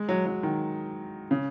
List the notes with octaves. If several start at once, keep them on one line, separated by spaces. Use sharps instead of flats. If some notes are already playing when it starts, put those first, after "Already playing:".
Already playing: G#3
F#3
F#3
D#3
C#3